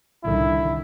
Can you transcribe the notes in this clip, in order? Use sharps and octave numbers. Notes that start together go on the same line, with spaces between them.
C2 D3 D#3 E4